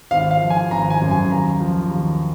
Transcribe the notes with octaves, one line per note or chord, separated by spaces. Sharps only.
G#1 F5
F5
F3
G#5
G#1 A#5
G#5
F#2
G#5
D#2 A#5
F3
D#2